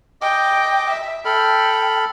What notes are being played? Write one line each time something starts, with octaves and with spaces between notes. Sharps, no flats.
D#5 G5 D6
E5
A4 G5 B5 F6